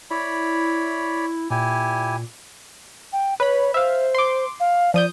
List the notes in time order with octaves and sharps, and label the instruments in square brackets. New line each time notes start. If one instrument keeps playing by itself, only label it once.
[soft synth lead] E4 [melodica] C#5 D5 B5
[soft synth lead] A#2 [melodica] E4 G4 G#5
[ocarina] G5
[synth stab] B4 B5 [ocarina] C#5
[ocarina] C5 [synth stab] E5 F5
[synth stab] C6 D6
[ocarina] F5
[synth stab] F3 D#6 G6 [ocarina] D5